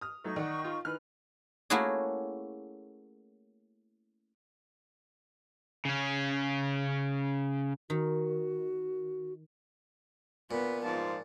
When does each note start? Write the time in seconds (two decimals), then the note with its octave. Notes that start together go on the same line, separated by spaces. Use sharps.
0.01 D#6 F6
0.25 F#3 A3 D#4 C#6
0.36 D#3 D5 F#5
0.64 F4
0.85 D#3 E3 B4 F6
1.70 A3 A#3 C#4 E4 F#4 G#4
5.85 C#3 C#4
7.90 D#3 F#4
10.51 A#2 B3 B4
10.85 G#2 F3 A5